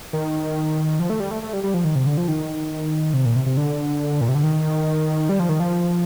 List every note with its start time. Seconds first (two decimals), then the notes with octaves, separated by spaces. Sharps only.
0.13 D#3
1.00 F3
1.10 A3
1.20 G3
1.31 A3
1.42 A3
1.53 G3
1.64 G3
1.74 F3
1.84 D#3
1.96 C3
2.06 D3
2.17 F3
2.28 D#3
3.14 C3
3.25 A#2
3.36 C3
3.46 C3
3.57 D3
4.21 A#2
4.29 C3
4.35 D3
4.43 D#3
5.29 G3
5.40 F3
5.49 D#3
5.60 F3